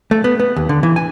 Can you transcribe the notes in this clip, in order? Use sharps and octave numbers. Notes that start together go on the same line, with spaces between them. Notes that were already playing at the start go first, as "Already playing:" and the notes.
A3
B3
B3
D#2
D3
E3
G#5